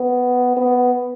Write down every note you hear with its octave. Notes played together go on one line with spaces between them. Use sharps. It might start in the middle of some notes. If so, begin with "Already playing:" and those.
Already playing: B3
B3